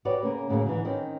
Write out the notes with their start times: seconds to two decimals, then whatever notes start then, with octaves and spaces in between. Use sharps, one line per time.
0.05 F#4 G4 B4 C#5 D5
0.23 C#3 A#3 C#4
0.49 A2 C#3 F#3 G#3 A#3
0.66 G#2 D3 E3
0.85 D#3 C4 C#4